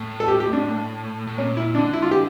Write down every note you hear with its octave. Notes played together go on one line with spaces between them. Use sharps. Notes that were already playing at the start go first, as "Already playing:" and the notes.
Already playing: A2
A4
G4
G4
D4
A2
A#2 C#4
E4
D3 D4
E4
F4
G4